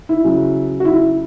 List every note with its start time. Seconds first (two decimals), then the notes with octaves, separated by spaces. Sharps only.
0.09 E4
0.25 C#3 F#3
0.80 F#4
0.85 E4